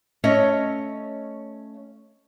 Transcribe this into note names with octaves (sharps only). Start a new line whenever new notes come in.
A3 C#4 C#5 D#5 E5